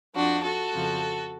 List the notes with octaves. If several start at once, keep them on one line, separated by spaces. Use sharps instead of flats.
F2 F3 D4 F#4
F#4 A4
F2 C#3 F3